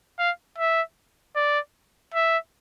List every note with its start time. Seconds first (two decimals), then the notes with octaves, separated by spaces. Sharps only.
0.19 F5
0.58 E5
1.36 D5
2.14 E5